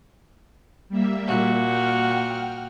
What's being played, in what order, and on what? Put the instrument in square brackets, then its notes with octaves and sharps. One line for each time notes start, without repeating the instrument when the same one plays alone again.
[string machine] G3 A#3 E5
[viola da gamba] A#2 F#4
[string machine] F#5 G5 F6